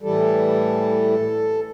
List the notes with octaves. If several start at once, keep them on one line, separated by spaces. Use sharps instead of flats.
A2 E3 G3 A4